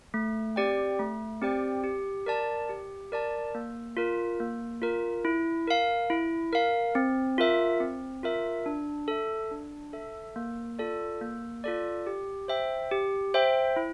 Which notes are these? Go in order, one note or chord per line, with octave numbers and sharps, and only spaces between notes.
A3
C4 G4 D5 G5
A3
C4 G4 D5 G5
G4
A#4 D5 A5
G4
A#4 D5 A5
A#3
F4 A#4
A#3
F4 A#4
E4
A#4 F5
E4
A#4 F5
C4
F4 A#4 E5
C4
F4 A#4 E5
D4
A4 E5
D4
A4 E5
A#3
F4 A4 D5
A#3
F4 A4 D5
G4
C5 E5 G5
G4
C5 E5 G5
E4